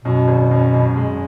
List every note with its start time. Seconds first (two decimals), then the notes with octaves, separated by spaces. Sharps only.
0.04 F#2 B2
0.28 G#1
0.51 F#2
0.74 F#2
0.96 G#3